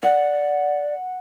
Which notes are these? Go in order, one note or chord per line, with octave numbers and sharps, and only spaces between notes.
D5 F#5